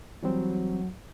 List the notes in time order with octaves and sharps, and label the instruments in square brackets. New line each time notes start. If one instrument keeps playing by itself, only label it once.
[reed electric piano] E3 G3 C4 [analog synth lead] F#3